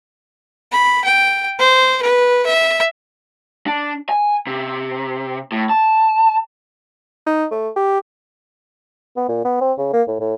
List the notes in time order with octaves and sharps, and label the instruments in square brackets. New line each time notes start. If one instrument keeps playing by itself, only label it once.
[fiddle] B5
G5
C5
B4
E5
[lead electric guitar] D4
G#5
C3
A2
A5
[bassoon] D#4
A3
G4
B3
A#2
B3
C4
C#3
A#3
A2
A2